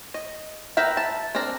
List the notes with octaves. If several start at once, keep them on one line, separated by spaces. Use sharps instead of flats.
D#5
A#4 B4 E5 G5 A#5
A5
C4 D4 A#4 A#5